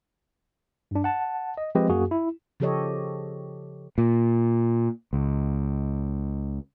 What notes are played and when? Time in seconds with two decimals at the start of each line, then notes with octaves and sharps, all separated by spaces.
0.91 G2 D4
1.04 F#5 A5
1.57 D#5
1.75 F3 G#3 C4 G4 B4 D#5
1.89 F#2 A#3 F#4 G#4
2.11 E4
2.60 C#3 F3 G4 A4 C#5 D#5
3.98 A#2
5.13 C#2